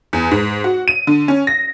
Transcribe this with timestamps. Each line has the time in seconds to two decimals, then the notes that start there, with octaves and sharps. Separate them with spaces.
0.13 E2
0.31 G#2
0.64 F#4
0.88 D#7
1.07 D3
1.28 C#4
1.47 A#6